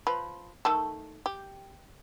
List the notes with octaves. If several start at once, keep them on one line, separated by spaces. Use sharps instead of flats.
F3 B4
D#3 A3 A4
G4